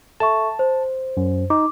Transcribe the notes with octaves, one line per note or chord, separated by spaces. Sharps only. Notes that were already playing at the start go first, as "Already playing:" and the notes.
A4 E5 A5 C#6
C5
F#2
D#4 D6